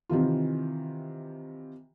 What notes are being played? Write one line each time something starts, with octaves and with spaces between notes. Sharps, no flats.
C3 D#3 E3 F4